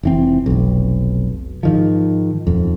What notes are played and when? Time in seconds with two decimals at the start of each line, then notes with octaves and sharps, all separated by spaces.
0.03 F1 E3 C4
0.46 F1 B1
1.63 G#2 D#3 F3
2.47 D#1 F2